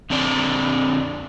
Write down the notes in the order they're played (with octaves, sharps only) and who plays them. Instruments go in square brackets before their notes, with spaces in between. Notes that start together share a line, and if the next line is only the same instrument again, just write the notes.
[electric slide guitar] F2 D3 C4 D5